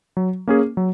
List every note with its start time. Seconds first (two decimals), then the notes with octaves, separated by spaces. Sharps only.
0.17 F#3
0.47 A#3 C#4 G#4
0.77 F#3